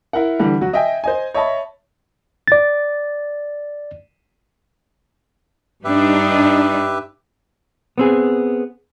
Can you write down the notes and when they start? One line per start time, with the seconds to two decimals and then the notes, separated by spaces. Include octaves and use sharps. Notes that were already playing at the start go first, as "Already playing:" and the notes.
0.13 E4 A#4 F#5
0.39 D3 E3 G3
0.61 F#3 F#4
0.73 D#5 E5 G5 G#5
1.04 C5 D#5 G#5
1.34 C#5 D#5 E5 A5 B5
2.48 D5 A6
5.84 G2 D4 D#4 G4 B4 E5
7.98 B3 C4 G#4